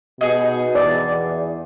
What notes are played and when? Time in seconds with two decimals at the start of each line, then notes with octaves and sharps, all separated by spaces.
0.21 B2 D#4 G#4
0.75 E2 D5